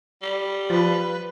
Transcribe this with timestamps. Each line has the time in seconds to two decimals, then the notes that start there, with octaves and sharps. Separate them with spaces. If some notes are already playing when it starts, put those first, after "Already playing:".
0.22 G3
0.70 F3 F4 B4 A6